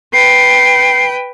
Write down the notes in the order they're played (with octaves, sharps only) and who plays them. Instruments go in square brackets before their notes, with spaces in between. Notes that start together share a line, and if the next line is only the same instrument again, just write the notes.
[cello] B4 G5 [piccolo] C7